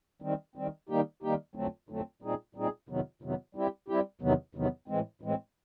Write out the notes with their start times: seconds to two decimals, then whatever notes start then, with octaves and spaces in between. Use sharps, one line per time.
0.22 D#3 G3 C4
0.56 D#3 G3 C4
0.89 D#3 G3 A#3 D#4 G4
1.22 D#3 G3 A#3 D#4 G4
1.55 F2 D3 F#3 A3 C4
1.89 F2 D3 F#3 A3 C4
2.22 A#2 G3 C4 D#4 G#4
2.55 A#2 G3 C4 D#4 G#4
2.89 F2 C3 D#3 F#3 B3
3.22 F2 C3 D#3 F#3 B3
3.55 G3 C4 E4 G4
3.88 G3 C4 E4 G4
4.21 E2 C3 D#3 F#3 B3
4.55 E2 C3 D#3 F#3 B3
4.88 A2 E3 G#3 C4
5.21 A2 E3 G#3 C4